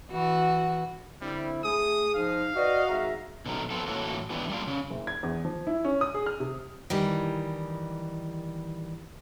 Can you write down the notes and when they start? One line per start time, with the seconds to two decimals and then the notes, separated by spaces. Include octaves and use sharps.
0.11 E3 F#4
1.21 D3 G3 C4 E4
1.64 A3 G#4 D#6
2.14 F3 D#4 F5
2.56 F#4 B4 D5 D#5
2.88 G#1 G#4 E5 A#5
3.46 B2 D3 D#3 F#3 A3 A#4
3.70 F3 B3 C4 F4 A4
3.87 A2 E3 F#3 A#3 F#4 A4
4.30 E3 B3 D4 G4
4.50 G3 A#3 D4 F4 G4
4.67 C#3
4.90 F#1
5.07 G#6
5.23 E2
5.45 F3
5.67 E4
5.85 C#4
6.01 D#6
6.14 G#4
6.26 F6
6.40 C3
6.90 D#3 E3 G3